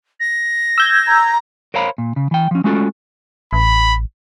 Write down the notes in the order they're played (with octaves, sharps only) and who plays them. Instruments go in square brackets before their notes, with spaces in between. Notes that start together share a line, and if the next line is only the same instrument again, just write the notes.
[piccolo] A#6
[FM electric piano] E6 G6 G#6
[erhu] A#5
[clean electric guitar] A#4 C5 C#5 F5 A#5 B5
A#2
C#3
E3 G5
F3 C#4
G#3 A3 C#4 F4 F#4 A4
[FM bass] A1 [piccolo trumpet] B5